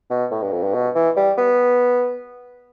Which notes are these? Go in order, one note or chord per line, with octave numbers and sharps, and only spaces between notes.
B2
A2
G2
F2
G2
B2
E3
G3
B3